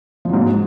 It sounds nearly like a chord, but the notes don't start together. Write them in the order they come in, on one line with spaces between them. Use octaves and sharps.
F3 F#3 G#2